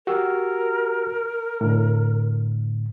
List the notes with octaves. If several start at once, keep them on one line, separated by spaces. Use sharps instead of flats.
F#4 G4 A#4 E6
A2 D3